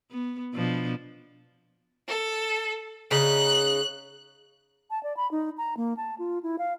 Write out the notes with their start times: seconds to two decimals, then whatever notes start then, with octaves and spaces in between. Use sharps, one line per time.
0.11 B3
0.54 B2 F3 D4
2.08 A4
3.11 C#3 D#4 F#6
4.91 A5
5.03 D5
5.17 B5
5.31 D#4
5.58 A#5
5.77 A#3
5.97 A5
6.19 F4
6.43 E4
6.59 F5